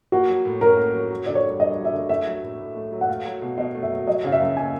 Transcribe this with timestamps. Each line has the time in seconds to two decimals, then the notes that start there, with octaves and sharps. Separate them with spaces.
0.12 A#3 F#4
0.28 F#3
0.45 A2
0.61 C#4 A#4
0.77 A#3
0.94 F#3
1.10 F#3
1.26 D3 D5
1.35 C#5
1.44 G2
1.60 G2 D#5
1.77 F#3
1.85 E5
1.93 D3
2.09 A3 E5
2.26 F#3
2.42 A2
2.60 A2
2.76 A3
2.92 F#3
3.01 F#5
3.08 A3 F5
3.25 F#3
3.42 B2
3.58 B2 D#5
3.74 A3
3.83 E5
3.91 F#3
4.07 F#3 D#5
4.24 C#3 F5
4.32 E5
4.40 F#2
4.57 G#5